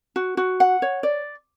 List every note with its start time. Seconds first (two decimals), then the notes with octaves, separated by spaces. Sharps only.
0.16 F#4
0.37 F#4
0.60 F#5
0.82 C#5
1.03 D5